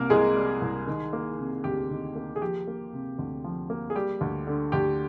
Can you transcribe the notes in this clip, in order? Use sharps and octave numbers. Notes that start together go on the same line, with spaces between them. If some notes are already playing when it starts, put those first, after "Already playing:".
Already playing: C2 C3 A#3 A#4
C2 G#3 G#4
G3
C2
D#3
A#3
C3
D2 G4
D#3
A#3
G#4
F3 G4
A#3
C3
D2
F3
A#3
G#4
G3 G4
D2
D3
D2 G4